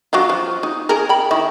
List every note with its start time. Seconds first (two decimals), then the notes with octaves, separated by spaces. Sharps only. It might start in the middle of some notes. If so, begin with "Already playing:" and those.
0.13 F#3 D4 F4
0.29 F3
0.63 D#4
0.89 G#4 A#4
1.09 G5 B5
1.31 D#3 E4